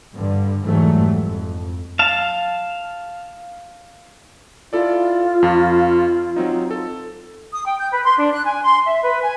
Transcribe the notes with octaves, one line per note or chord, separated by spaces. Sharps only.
G2 D3
F1 G#2 E3 F#3 G3 A3
F2
F5 A5
E4 F4 A4 D5
F2
F#3 C4 D#4
A4
D#6
G5
G6
B4
C6
D4
F#6
G#5
C6
E5
B4
G#5